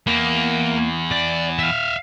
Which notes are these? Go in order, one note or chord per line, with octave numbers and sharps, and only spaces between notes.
E2 A#3
D5
E5 F5